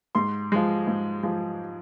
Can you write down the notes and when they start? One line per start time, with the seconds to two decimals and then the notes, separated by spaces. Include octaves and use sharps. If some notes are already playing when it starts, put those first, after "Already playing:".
0.15 G#2 C6
0.52 F3 G#3
0.87 G#2
1.23 F3 G#3